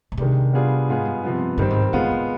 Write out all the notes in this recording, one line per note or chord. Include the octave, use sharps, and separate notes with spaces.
B2
C3 D#3 G#3 D4 G4
G3 B3 D4 F4 G#4
G#2 G#3 B3 F4 G#4
G2
C3 F3 B3
G2 D#3 G3 C4
G#2
G2
D3 G#3 B3 F4
D3